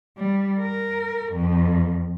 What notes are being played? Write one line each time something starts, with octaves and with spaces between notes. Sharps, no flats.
G3
A#4
F2